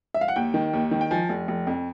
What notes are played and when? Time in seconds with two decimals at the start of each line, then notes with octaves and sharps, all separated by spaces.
0.14 E5
0.21 F5
0.28 F#5
0.36 D#2 G5
0.54 D#3
0.73 D#2
0.91 D#3
1.01 G5
1.11 F3 G#5
1.29 F1
1.48 F1
1.67 F2